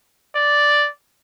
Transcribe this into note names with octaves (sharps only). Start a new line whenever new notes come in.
D5